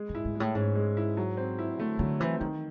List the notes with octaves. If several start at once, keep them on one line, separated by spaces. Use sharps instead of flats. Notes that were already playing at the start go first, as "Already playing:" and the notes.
Already playing: G#3 G#4
G#2
E4
G#2
A2 G#3
G#2 C#4
G#3
E4
F#3
C4
E4
D3 A3
D3 F#3
E3 C4
D#3 E3